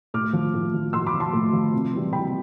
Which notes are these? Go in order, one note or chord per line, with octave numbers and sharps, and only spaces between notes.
A2 D6 F6
F3
A2
F3
A2 C6 E6
B5 D6
F3
A5 C6
A2
F3
C3
E3 G3
C3 G5 B5